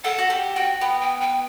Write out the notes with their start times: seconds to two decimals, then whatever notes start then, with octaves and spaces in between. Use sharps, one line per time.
0.04 A4 F#5
0.18 F#4
0.30 G4 F#5
0.56 F#4 G5
0.81 B3 G5
1.01 G5
1.21 G5